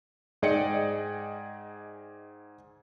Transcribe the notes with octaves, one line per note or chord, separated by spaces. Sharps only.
G#2 G#4 D5 D#5 G5 C#7